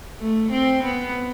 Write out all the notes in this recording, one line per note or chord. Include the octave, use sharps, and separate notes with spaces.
A3
C4
B3